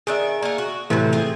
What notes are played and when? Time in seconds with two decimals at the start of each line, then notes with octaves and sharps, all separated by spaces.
0.07 D#3 D4 G#4 E5
0.42 A3 A#3
0.58 F#4
0.90 A2 C3 E3 F#3 A3
1.13 C4 F4 G#4